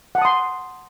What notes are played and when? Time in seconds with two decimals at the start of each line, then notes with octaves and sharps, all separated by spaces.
0.15 F#5
0.18 A5
0.22 D#6
0.25 C6